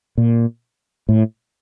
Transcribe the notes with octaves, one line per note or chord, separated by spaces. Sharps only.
A#2
A2